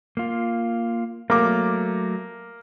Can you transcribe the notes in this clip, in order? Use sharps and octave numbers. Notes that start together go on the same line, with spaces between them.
A#3 F4
F#3 A3 A#3 D6